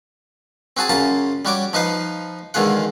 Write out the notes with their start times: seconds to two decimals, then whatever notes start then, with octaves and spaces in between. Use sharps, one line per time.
0.77 C4 F#4 G#4 A5
0.90 F#2 C#3 F4 A5 A#5
1.45 G3 F#4 C#5 D6
1.73 F3 D#4 B4 F5
2.54 E2 D3 D#3 G#3 F4 F#5